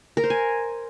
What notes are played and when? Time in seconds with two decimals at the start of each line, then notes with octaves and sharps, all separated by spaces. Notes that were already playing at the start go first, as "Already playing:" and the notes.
0.17 A#4
0.24 C5
0.30 G#5